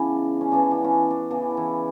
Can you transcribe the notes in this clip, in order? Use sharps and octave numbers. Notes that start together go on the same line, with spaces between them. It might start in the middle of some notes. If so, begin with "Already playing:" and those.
Already playing: C#3 E3 B3 D4
C#4
C#3 E3 B3 D4
D4
C#4
D4
D4
C#3 E3 B3 D4
E3 E4